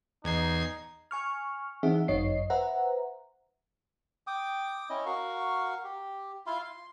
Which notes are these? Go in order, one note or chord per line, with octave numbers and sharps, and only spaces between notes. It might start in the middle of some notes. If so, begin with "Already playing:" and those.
E2 D#4 G#6 C7
G#5 C#6 F6
E3 C4 D#4 G#4 E5 F#5
G1 F#2 D#4 C#5 D#5 C7
B4 C5 E5 F#5 A#5
G5 D6 D#6
C#4 E4 D#5
F#4 A#4 F5 C#6
G4
E4 F4 F5 C6
C6